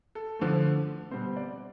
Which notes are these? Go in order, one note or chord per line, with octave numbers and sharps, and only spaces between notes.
A4
D3 F3 A3
B2 G3 C4 C5
D5